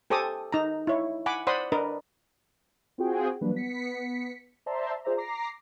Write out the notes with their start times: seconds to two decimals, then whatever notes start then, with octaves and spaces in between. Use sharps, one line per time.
0.10 G4 A4 C5 G#5 D6 D#6
0.53 D#4 A#5
0.87 E4 C#5
1.26 F#5 G#5 B5 D6
1.47 C5 D5 F#5 B5 C6 D#6
1.72 D4 A#4 B4 D#5
2.98 C4 F4 F#4 G#4 G5
3.41 E3 F#3 G3 A#3 D4 B4
3.55 B3 B6 C#7
4.66 C5 D5 E5 A5 A#5 C6
5.04 F4 G#4 C5 D5 E5 A#5
5.17 A#5 D6 A#6 C7